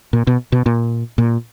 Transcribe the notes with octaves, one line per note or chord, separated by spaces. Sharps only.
A#2
B2
B2
A#2
A#2